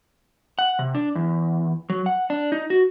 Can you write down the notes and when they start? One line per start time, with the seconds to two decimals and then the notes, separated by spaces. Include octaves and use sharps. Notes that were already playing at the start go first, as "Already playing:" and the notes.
0.59 F#5
0.79 C3
0.95 D4
1.15 E2
1.90 F#3
2.06 F#5
2.30 D4
2.52 D#4
2.70 F#4